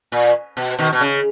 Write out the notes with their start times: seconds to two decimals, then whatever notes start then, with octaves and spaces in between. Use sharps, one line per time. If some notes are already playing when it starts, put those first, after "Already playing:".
0.12 A#2
0.57 B2
0.79 B2 D#3
0.93 B2
1.01 C#3